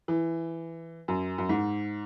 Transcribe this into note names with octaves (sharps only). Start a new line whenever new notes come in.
E3
F#2
F#2
G#2